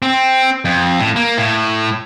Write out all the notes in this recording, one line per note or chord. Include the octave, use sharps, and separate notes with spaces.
C4
F2
A2
A#3
A2